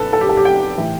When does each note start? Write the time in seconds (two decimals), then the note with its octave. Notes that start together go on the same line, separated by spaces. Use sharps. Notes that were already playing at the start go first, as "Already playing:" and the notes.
Already playing: B1 A4 B4
0.13 A4
0.21 G4
0.29 A4
0.37 G4
0.45 G5
0.78 A2 E3